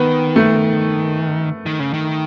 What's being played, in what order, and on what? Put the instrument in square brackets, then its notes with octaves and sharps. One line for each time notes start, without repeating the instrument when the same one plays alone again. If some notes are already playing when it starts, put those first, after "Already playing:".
Already playing: [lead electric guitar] D#3 [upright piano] B3
[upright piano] A3
[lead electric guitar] D#3
C#3
D#3